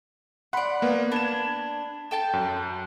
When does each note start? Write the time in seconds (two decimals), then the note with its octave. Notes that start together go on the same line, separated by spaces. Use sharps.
0.53 D5 F#5 B5 C6
0.82 A#3 B3 B4
1.12 D4 B5 G#6 E7
2.11 A4 G5 A5
2.33 F#2